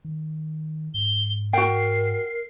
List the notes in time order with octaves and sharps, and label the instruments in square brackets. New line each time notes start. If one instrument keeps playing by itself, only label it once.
[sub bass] D#3
[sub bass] G#2 [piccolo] G7
[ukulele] F#4 G5 [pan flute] A#4 [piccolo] C7